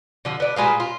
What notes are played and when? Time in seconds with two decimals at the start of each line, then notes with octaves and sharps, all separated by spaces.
0.25 D3 F3
0.40 B3 D5
0.56 A#2 G#3 B4 F5
0.80 F4